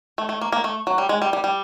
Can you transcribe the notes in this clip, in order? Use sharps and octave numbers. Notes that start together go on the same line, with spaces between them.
A3
A3
A#3
A#3
A3
F#3
G3
G#3
G3
G3
G3